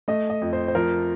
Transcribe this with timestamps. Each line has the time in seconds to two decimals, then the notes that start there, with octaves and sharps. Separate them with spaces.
0.08 A3 D#5
0.30 D#5
0.42 F2
0.53 C5
0.68 C5
0.75 F3 A#4